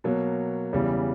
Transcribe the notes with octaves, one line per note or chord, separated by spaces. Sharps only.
B2 F#3 A#3
E2 C#3 E3 G3